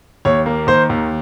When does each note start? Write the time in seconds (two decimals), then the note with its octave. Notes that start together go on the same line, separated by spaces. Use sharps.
0.25 D#2 C#5
0.46 A#3
0.67 D#3 C5
0.90 D#2